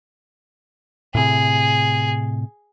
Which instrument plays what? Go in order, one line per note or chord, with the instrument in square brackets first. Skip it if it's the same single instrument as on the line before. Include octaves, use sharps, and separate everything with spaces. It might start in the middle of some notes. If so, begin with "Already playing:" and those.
[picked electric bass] A2 C3 [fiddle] G#4